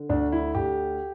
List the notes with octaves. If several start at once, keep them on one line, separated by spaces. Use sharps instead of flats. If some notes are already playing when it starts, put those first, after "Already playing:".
Already playing: D3
D2 D4
E4
D2 G4